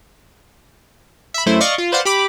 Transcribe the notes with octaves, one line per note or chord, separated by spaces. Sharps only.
E5 B5
F#2 A3 E4 C5
D5 D#5 F5 C#6
F4
B4 C5 D5 F5 F#5
G4 B5 D6